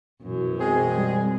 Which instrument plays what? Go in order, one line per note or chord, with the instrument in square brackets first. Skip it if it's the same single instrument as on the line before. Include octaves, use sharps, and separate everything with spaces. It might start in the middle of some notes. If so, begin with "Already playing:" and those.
[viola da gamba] F#2 [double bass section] B2 E3
[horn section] G#3 C4 G#4
[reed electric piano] G3